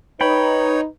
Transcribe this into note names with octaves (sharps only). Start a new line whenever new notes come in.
D#4 B4 C#5 G5 B5